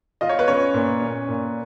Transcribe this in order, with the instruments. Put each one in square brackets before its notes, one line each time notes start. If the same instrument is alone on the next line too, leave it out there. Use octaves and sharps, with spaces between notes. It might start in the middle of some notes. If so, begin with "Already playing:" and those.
[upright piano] F4 [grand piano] D#5
[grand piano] C#5
B4
[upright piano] C#4 [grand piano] C#5
[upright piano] A#2
C#4
A#2